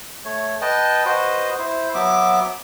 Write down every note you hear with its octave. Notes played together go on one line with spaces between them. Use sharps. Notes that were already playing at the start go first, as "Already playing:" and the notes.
A3 C#5
B4 D#5 G5 A5
F#4 B4 C5 D#5
E4 C5
F#3 B3 E5 D6